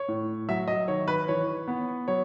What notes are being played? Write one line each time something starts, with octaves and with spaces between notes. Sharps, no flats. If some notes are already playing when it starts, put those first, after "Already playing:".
Already playing: C#5
A2
F#3 E5
D#5
D#3 C#5
B4
E3 C#5
B3
F#3 C#5